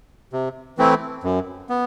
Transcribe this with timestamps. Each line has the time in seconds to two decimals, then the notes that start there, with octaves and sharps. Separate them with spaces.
0.33 C3
0.78 E3 A3 C4 E4
1.24 F#2
1.69 B3